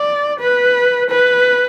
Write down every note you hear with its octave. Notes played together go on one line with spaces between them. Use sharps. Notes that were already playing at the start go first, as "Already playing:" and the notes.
Already playing: D5
B4
B4